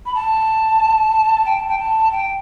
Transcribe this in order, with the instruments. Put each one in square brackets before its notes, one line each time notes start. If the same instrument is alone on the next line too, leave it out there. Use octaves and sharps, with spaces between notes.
[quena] B5
A5
G5
A5
G5
A5
G5